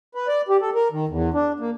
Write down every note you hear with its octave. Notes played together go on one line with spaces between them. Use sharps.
B4
D5
G4
A4
A#4
D#3
E2
D4
A#3